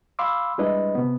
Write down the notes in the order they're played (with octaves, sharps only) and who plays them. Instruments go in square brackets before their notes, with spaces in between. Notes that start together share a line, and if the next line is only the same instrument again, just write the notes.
[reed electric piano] F5 B5 C6 D6 E6
G3 G#3 D4 E4 B4 D#5
C3 B3